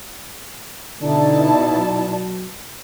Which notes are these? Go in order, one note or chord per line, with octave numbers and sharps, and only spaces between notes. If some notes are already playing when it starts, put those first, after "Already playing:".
B2 D3 D#4 E4 D5 A5
F#3